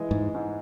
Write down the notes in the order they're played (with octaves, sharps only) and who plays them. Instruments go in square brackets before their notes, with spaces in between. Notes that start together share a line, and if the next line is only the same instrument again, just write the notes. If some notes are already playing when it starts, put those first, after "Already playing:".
Already playing: [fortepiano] E3 G#3
[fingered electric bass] G#2
[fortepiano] G#2